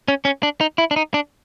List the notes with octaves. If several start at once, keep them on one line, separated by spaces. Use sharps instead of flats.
C#4
C#4
D4
D#4
E4
D4
D#4
D4